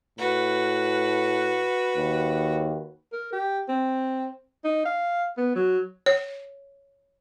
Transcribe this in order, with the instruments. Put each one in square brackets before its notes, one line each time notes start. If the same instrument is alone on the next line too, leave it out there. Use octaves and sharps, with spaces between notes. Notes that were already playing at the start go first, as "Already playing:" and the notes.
[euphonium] A2 [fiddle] F#4 B4
[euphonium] D#2
[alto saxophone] A#4
G4
C4
D#4
F5
B3
F#3
[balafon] C#5